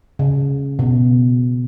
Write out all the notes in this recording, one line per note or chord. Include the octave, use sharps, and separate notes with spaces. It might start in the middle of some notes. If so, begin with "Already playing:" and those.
C#3
B2